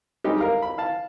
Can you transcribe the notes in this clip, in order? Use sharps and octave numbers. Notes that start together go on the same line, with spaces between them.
G3 G#3 D#4 G4
A#4 F5 A#5
B5
F5 A5